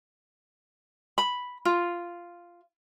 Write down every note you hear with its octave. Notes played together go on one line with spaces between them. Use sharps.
B5
F4